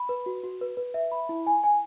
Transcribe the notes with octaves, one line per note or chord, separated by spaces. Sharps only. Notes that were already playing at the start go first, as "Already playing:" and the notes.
Already playing: B5
B4
F#4
F#4
B4
B4
E5
B5
E4
G#5
G#5